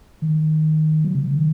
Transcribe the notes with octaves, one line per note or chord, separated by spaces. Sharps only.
D#3
F#3
C#3
C#3
D#3